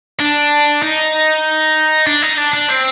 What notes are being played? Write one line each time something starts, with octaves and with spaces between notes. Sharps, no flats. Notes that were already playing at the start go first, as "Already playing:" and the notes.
D4
D#4
D4
D#4
D4
D4
C4